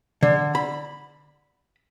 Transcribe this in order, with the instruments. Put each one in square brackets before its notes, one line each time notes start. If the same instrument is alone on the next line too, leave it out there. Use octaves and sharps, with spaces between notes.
[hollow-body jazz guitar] D3
B5